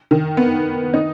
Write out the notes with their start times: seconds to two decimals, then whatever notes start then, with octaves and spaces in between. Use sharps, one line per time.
0.11 D#3
0.37 B3
0.94 D#4